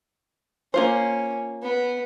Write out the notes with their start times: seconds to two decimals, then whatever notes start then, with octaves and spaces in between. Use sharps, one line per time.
0.74 A#3 C#4 F4 C5
1.63 B3